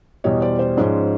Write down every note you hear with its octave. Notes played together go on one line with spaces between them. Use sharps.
E2 B2 G3 C#5 D#5
C5 D5
C5 D5
G#2 F3 G#3 C#4